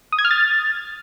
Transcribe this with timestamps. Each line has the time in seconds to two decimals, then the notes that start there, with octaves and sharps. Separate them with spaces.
0.12 D#6
0.19 G#6
0.25 F6
0.31 A6